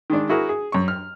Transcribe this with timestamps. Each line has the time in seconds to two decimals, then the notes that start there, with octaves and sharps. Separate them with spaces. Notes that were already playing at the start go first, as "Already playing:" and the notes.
0.10 D#3 G#3 D4
0.29 E4 F#4 G#4 A#4
0.49 G#4
0.72 F#2 C#6
0.88 F6